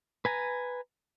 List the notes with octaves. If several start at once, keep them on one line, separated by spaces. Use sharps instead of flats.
B4 G#5 A#5